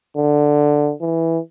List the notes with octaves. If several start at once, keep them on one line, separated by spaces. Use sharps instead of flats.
D3
E3